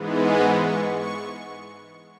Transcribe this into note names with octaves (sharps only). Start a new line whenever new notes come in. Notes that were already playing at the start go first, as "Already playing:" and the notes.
Already playing: G#2 E3 G#3 B3
C#6
C#6